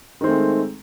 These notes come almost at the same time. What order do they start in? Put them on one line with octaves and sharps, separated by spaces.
D#3 C4 A3 G#3